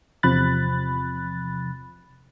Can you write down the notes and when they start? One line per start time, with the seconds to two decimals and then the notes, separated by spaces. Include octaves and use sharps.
0.23 E2 C3 F3 B5 F#6 A6